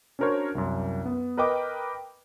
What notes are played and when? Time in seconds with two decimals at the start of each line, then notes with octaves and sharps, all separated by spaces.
0.19 C#4 D4 F#4 A#4 C5 C#5
0.55 C2 F#2
1.05 B3
1.37 A#4 B4 D#5 G5 D6